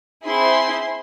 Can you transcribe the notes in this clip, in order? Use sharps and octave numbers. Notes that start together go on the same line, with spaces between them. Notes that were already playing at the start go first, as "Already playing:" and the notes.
C4 E4 G#4 C6